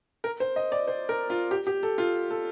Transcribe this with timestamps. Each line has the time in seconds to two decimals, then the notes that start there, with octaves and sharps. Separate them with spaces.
0.24 A#4
0.40 C5
0.56 D#5
0.72 D5
0.88 C5
1.09 A#4
1.30 F4
1.51 G4
1.67 G4
1.83 A4
1.98 F4
2.30 A4